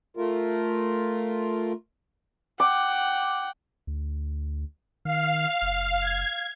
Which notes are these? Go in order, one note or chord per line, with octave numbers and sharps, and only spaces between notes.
A3 F4 A#4
F#5 G5 D6
D2
D#3 F5
F#1
G#6